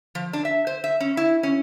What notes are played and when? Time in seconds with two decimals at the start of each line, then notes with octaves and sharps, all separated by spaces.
0.15 F3
0.33 D4
0.45 E5
0.67 C5
0.84 E5
1.00 C#4
1.17 E4
1.43 C#4